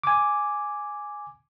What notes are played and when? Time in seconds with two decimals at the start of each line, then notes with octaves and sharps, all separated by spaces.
0.04 G#5 D6